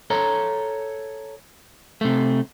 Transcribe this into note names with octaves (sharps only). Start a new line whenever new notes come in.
A4 C#5 A#5
C3 A3